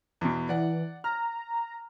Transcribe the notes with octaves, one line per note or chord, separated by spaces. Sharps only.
E2 B2
E3 D5 F#5
A#5 F6